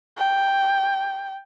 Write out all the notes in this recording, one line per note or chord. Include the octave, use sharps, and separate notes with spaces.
G5